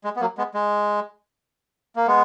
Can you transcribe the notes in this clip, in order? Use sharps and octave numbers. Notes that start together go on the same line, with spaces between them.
G#3
B3
F#3 A#3
G#3 B3
G#3
A#3
G#3 B3